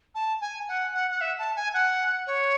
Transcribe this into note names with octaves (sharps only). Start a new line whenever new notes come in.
A5
G#5
F#5
F#5
F#5
E5
A5
G#5
F#5
C#5